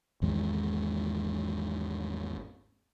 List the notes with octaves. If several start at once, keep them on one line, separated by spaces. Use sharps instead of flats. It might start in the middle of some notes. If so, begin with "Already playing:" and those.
G#1 E2 G#3